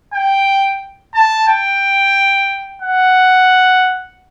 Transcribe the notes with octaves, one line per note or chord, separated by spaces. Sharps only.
G5
A5
G5
F#5